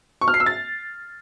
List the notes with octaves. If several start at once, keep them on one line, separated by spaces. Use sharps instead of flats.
C#6
F6
C7
E6
A6